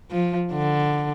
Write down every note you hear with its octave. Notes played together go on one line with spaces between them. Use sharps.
F3
D3